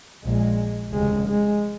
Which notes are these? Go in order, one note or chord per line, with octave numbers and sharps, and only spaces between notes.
A#1 A#2 G#3
F1 D#2 C#3 G#3
G#3